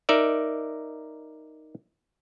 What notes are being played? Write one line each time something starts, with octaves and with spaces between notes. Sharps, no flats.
D#4 A#4 D5 E5